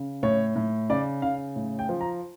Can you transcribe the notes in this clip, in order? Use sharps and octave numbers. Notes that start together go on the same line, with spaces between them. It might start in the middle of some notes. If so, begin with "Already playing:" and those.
Already playing: C#3
A2 C#5
A2
C#3 D5
C#3 F5
A2
G5
F3
A#5